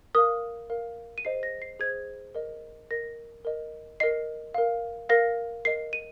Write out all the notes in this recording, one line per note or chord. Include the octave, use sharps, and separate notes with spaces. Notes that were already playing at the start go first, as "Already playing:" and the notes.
A#4 F5 D#6
A#4 F5
D#7
G#4 C5 D#5 C7
A#6
C7
G#4 C5 D#5 G#6
A#4 D#5
A#4 D#5 A#6
A#4 D#5
A#4 D#5 C7
A#4 F5
A#4 F5 A#6
A#4 D#5 C7
D#7